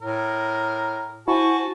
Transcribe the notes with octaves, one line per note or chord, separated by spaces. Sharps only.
A2 A#4
E4 F#4 C5 G#5 A5 C#6